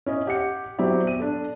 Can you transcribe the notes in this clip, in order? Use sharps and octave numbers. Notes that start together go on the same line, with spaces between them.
C#4 E4 D#5
G4 F#5 C#7
F#3 C4 E4 G4 D5
B3 D#7
D4 A4